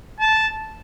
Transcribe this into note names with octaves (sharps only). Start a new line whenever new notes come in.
A5